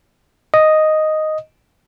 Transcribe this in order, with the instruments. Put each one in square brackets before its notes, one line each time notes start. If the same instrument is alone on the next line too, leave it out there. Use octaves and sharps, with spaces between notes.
[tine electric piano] D#5